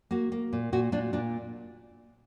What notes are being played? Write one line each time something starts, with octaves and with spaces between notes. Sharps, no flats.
A#3 F#4
A#3
A#2
A#2 F#4
A#2 D4
A#2 D4